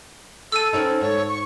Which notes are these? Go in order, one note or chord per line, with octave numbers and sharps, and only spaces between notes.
A4 E6 D#7
C4 C#4 D#4
G#2 C#5
C#6